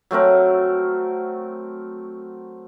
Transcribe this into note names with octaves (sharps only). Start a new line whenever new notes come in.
F#3 A3 C4 A#4